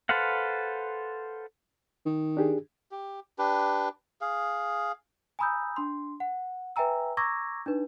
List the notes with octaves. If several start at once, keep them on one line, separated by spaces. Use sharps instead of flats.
A4 B4 C5 F5 F#5
D#3
D4 G4 G#4
G4
D4 G4 B4
G#4 F5
G#5 A#5 B5 D#6 E6 G6
D4 C6
F#5
B4 E5 G5 G#5 A#5 E6
A#5 C#6 D6 E6 G#6 A#6
D4 D#4 B4